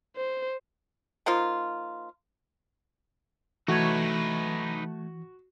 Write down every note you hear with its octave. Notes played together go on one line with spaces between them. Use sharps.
C5
F3 A#3 D#4 F4
E3 A3 D#4 F#4 B4 C#5